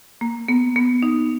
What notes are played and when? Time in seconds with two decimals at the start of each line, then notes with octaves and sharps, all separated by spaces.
0.21 A#3
0.48 B3
0.76 B3
1.03 D#4